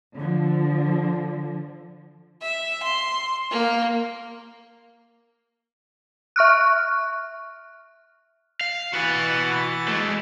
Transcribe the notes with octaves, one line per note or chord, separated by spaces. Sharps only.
D3 F3
E5
C6
A#3
E5 C#6 F6 F#6
F5
E3 F#4 B4 F#5 A6
G#3 A3